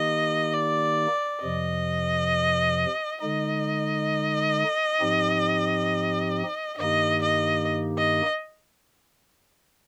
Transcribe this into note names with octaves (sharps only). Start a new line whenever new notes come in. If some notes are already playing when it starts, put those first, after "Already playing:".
Already playing: D#3 A#3 D#4 G4 D#5
D5
F2 C3 F3 D#5
D3 G#3 D#4 D#5
G#2 F3 C4 D#4 G4
G2 D#3 A#3 D#4 G4 D#5
D#5
D#5